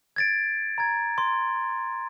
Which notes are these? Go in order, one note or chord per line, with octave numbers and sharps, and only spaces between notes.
G#6 A6 D7
A#5 G#6
C6